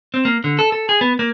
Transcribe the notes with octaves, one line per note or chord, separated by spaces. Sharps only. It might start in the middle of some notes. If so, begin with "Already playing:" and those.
C4
A#3
D3
A4
A4
G#4
B3
A#3